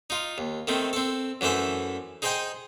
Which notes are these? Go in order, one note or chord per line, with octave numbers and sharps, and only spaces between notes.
D#4 F4
D#2
D#3 A3 C4
C4 A4
F#2 E3 A3 C5 E5
D#4 G#4 C5 D#5 G5 C6